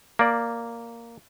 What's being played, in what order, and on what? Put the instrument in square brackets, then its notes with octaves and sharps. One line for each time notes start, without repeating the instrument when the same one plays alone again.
[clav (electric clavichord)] A#3 D5